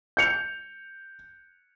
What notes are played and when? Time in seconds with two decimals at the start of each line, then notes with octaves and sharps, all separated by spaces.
0.17 G6 C#7 F7